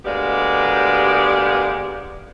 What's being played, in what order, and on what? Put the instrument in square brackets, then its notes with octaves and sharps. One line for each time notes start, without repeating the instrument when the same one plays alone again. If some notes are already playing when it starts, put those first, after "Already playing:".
[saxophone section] D2 G#3 A#3 B3 G4 D5